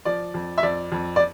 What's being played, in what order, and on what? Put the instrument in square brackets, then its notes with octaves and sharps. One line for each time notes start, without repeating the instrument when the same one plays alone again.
[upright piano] F3 D5
F2
E5
F2 D5
F2
D5